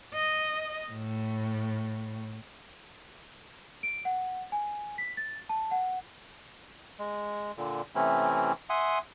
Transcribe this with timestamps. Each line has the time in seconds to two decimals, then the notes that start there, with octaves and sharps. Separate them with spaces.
0.14 D#5
0.92 A2
3.83 D7
4.05 F#5
4.52 G#5
4.98 B6
5.17 A6
5.49 A5
5.71 F#5
6.99 G#3
7.58 A#2 D3
7.95 C3 E3 A3 C4 C#4 E4
8.70 E5 F#5 G#5 C6 D#6